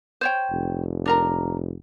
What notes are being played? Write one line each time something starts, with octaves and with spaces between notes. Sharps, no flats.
C5 C#5 G5
F1
D4 A#4 A#5